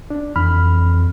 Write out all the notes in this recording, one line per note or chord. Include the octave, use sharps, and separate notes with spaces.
D4
F2 E3 B5 F6